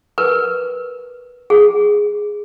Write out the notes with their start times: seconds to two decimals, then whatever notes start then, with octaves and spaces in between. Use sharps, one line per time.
0.18 A#4 B4
1.50 G#4